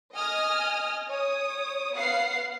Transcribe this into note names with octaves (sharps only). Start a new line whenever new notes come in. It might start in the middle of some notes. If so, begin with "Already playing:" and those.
D#5 G#5 D#6 F6
C#5 D#6
B3 F5 F#5 C7